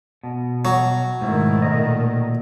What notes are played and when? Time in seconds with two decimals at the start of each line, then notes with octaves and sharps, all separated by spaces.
0.23 B2
0.65 F#3
1.21 G#2 B2 D#3 A3 E4
1.62 A#2 D#5